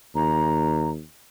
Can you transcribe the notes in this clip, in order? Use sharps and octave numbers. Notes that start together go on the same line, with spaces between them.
D#2 A#5